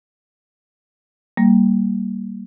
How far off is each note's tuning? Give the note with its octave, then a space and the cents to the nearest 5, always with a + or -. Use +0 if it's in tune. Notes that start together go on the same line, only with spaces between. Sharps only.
G3 -10 A#3 +0